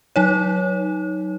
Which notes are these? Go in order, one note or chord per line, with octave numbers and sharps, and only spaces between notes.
F#3 D#4 C#5